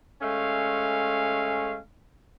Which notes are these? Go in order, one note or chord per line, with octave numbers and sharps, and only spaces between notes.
G#3 A3 C#4 F5